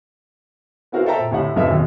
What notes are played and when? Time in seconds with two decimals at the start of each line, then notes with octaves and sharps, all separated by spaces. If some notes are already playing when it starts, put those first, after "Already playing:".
0.92 B3 E4 F#4 A#4 C5 F5
1.06 A4 C5 E5 G5 A5 A#5
1.19 A#2
1.31 D2 A2 G4 C#5 E5 F#5
1.56 F#1 B1 F#2 A4 B4 E5
1.71 D#2 B2